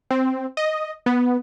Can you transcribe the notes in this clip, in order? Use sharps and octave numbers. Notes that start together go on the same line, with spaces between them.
C4
D#5
B3